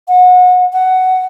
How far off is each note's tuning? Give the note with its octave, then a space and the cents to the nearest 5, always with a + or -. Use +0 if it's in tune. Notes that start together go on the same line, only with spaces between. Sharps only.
F#5 -25
F#5 +10